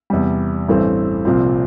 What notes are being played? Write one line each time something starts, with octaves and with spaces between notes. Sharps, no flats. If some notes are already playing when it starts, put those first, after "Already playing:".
E2 C3 G3
A1 G2 E3 A3 C4
C2 A#2 F3 C4